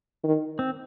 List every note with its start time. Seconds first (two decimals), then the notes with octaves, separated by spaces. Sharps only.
0.24 D#3
0.59 C4